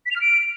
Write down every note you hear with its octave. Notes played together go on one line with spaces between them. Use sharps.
B6
F7
F6
D7